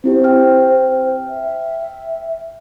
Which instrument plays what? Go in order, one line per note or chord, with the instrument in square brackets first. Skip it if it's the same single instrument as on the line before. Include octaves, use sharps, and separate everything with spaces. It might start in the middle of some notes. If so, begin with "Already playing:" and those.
[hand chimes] C4 E4 G4 [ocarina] C5
[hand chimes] G5 F6
[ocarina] E5